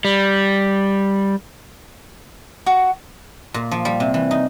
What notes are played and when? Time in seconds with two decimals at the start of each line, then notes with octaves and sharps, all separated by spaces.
0.05 G3
2.66 F#4
3.54 A#2
3.71 F3
3.85 G3
4.00 C3
4.14 E3
4.31 D#4